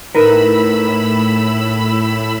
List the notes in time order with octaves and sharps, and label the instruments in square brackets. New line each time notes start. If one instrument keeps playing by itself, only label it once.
[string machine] A2 B5 E6 [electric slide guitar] D#4 A#4 B4